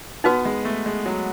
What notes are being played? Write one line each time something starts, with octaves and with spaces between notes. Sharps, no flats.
B3 D#4 F#4 B4
G#3
A3
G#3
F#3